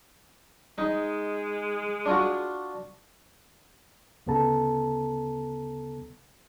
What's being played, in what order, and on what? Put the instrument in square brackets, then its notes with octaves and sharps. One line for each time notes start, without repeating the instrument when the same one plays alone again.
[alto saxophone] G#3 [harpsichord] D#4
[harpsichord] D4 F4 F#4
[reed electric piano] D2 C#3 B3 A4 A5 A#5